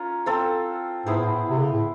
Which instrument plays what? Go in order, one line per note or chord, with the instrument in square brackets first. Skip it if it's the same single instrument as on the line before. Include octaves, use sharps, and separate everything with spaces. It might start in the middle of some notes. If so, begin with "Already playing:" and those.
Already playing: [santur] C#4 F4 A#4
C4 F4 A4 C5
[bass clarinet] G#2 [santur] B3 E4 G#4 C5
[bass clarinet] A2
A2
C3
C#3
A2